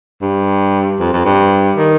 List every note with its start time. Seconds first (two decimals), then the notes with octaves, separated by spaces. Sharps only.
0.22 G2
1.00 F2
1.13 F2
1.25 G2
1.77 D#3